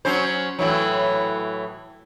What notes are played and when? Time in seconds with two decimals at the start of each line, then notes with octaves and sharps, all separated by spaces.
0.05 F#3 C#4 C5
0.59 A2 E3 F#3